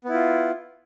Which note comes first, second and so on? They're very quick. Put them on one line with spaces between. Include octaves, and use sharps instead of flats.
B3 E4 F4